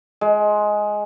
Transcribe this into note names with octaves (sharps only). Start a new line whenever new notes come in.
G#3